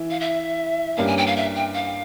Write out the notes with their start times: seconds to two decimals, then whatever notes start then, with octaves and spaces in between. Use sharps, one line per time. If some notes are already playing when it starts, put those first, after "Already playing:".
Already playing: E3 E4
0.10 F5
0.20 E5
0.97 G2 G3 A#3 C#4 F5
1.07 G#5
1.17 G5
1.26 F5
1.36 E5
1.55 G5
1.74 F5